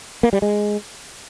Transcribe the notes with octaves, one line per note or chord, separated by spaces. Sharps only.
A#3
G3
G#3